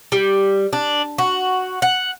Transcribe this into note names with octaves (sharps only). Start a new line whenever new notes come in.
G3
D4
F#4
F#5